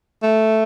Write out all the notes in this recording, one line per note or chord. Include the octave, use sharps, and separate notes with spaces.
A3